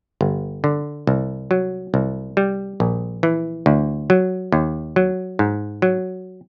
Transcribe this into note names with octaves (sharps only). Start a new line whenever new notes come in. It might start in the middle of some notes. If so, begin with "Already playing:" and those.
G1
D3
C2
F#3
C2
G3
A#1
E3
D2
F#3
D#2
F#3
G#2
F#3